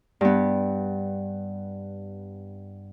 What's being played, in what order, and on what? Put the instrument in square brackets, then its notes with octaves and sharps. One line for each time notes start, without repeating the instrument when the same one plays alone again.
[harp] G2 B3